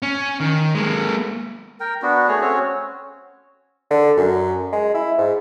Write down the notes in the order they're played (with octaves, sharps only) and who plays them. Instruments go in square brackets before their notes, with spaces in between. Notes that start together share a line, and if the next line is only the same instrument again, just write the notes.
[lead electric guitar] C#4
D#3
G#3 A#3
[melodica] A#4 G5
B3 D4 F#4
A3 G#4 C#5
C4 C#4 F#4 C#5
[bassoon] D3
F#2
G#3
E4
G#2